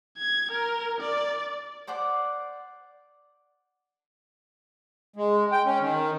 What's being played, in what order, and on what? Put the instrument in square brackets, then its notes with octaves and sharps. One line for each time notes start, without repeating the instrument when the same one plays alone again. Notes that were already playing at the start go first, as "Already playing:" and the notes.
[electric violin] G#6
A#4
D5
[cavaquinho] C5 D5 F#5 D6
[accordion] G#3
G5
C#4
D#3